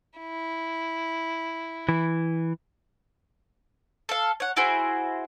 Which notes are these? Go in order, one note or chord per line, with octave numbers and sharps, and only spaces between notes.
E4
E3
A4 F5
C#5 F#5
E4 F#4 G#4 C5